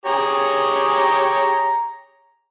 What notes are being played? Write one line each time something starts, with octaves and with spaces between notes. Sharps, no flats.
G4 G#4 C#5 A#5